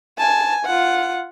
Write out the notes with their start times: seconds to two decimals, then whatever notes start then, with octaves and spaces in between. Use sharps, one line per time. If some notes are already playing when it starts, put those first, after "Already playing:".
0.18 G#5 A5
0.65 F4 F#5